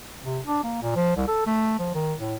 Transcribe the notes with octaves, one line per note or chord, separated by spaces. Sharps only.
C3
D4
A#3
A#2
F3
C2
A4
A3
F3
D#3
A2